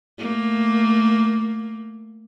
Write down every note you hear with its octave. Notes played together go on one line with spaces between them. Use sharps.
A3 A#3